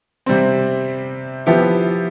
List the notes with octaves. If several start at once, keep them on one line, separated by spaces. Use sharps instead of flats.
C3 G3 C4
F3 B3 E4 G4